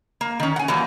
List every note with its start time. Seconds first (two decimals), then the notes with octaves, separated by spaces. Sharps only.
0.21 A#3
0.40 D#3 C#4
0.56 F#5 G#5
0.68 E3 F#3 G3 A#3